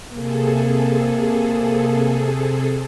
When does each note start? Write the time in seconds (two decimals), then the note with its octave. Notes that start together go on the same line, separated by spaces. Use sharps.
0.13 C3 A#3 G#4 A4